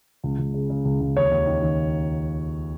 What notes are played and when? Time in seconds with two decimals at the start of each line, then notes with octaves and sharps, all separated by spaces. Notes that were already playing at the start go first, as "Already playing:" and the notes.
0.24 C#2
0.39 C#2
0.54 C#3
0.70 C#3
0.85 C#2
1.01 C#2
1.17 D#2 C#5
1.31 D#2
1.47 D#3
1.62 D#3